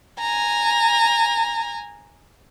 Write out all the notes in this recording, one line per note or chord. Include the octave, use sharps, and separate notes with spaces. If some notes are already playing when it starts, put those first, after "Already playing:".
G#5 A#5